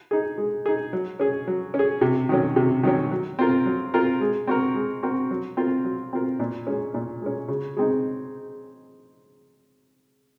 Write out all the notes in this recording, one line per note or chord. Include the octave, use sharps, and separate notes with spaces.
D#4 G#4
G#3
D#4 G#4
F#3
C#4 G#4
F#3
C#4
G#4
C3
D#3 F#3 C#4
C3
D#3 F#3 C#4
F#3
C4 F4 A#4
F#3
C4 F4 A#4
G#3
C4 F#4 A#4
G#3
C4 F#4 A#4
F#3
C4 F4 A#4
F#3
C4 F4 A#4
A#2
G#3 C#4
A#2
G#3 C#4
C#3
G#3 C4 D#4